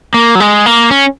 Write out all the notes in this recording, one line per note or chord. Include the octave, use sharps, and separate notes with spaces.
A#3
F#3
G#3
A#3
C#4